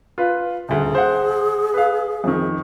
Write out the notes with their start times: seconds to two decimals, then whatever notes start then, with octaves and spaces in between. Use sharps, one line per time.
0.18 F4 B4
0.69 D#1 D2 G#4
0.95 C5 F#5
1.74 B4 F5
2.24 F2 D#3